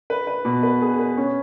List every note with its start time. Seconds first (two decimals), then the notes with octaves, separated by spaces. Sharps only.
0.10 B4
0.27 B4
0.45 B2
0.63 B4
0.81 G#4
0.99 B4
1.17 C#4